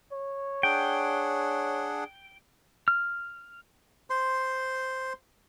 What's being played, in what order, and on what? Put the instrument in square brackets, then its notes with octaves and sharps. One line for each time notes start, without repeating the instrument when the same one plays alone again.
[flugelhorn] C#5
[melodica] D4 G#4 F#5 [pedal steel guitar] G5
[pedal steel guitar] F6
[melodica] C5 C6